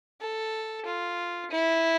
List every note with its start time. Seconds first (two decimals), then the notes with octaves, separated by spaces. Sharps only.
0.21 A4
0.86 F4
1.51 E4